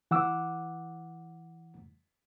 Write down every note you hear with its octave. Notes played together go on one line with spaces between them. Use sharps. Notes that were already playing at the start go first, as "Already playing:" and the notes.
E3 F#5 D6 E6